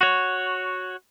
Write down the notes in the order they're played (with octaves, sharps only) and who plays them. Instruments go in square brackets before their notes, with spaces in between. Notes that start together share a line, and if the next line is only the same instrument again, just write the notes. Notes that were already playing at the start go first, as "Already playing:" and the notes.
[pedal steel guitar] F#4 C#5